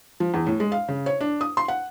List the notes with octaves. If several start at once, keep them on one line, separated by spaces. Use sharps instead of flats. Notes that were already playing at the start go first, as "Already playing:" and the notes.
F3
E2
A2
G#3
F5
C#3
C#5
D4
D#6
C6
F#5